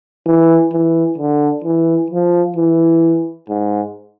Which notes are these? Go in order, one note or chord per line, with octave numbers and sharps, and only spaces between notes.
E3
E3
D3
E3
F3
E3
G#2